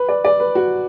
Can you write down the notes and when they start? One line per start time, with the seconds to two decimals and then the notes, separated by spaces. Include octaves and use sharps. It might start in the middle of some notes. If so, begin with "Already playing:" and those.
Already playing: B4
0.09 D5
0.25 D5
0.40 B4
0.55 F#4